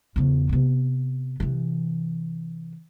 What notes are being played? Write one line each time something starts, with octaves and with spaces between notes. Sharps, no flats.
E2 C#3
C3 B3
C3 E3